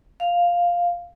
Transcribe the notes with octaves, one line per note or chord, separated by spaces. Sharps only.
F5